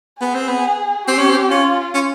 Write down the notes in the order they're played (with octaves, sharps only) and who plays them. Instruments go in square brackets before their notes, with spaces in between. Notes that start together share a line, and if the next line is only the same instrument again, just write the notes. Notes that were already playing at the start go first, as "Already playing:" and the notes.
[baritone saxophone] B3 [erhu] G#4
[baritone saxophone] C4
B3
[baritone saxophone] C4 [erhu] G4
[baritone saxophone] C#4
C4
[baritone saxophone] C#4 [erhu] F4
[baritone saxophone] C#4